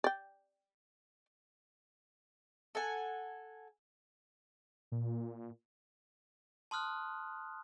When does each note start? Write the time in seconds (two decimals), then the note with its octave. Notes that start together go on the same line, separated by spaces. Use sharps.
0.04 D5 G5
2.75 A4 F#5 G#5
4.92 A#2
6.71 A5 C6 D#6 F6 F#6